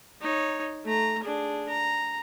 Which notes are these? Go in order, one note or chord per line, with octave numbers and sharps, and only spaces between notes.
D#4 C#5
A3 A#5
D4 G#4
A#5